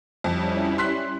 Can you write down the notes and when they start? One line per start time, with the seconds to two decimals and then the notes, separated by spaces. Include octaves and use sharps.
0.24 F2 G3 C#4 E4
0.78 C6 F#6 B6